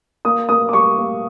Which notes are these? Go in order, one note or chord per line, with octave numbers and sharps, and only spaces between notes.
A#3 D#6
A#3 D#6
D6
G3 C#6
A#3